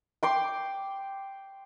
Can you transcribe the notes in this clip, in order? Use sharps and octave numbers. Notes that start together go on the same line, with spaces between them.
G5 C6 D6